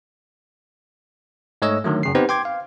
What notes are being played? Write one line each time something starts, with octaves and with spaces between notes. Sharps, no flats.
G#2 A3 C#5 D#5 E6
D3 D#3 F#3 A3
F#2 C#3 C7
B3 C4 D#4 G4 B4 C5
G5 C6 D6 G#6
F5